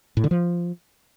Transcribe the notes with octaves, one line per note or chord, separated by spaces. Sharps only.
A2
D3
F3